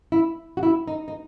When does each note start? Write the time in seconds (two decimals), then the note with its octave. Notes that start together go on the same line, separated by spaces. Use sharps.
0.12 E4
0.57 F#4
0.63 E4
0.87 D#4
1.08 D#4